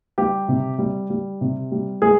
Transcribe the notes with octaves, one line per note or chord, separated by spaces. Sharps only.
G3 G4
C3
G3
G3
C3
G3
G#3 G#4